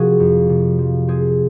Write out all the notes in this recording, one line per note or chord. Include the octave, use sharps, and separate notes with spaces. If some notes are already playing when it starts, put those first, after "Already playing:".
Already playing: C3 F3 C4 F#4 G#4 A#4
F2
C3
F3
C4 G#4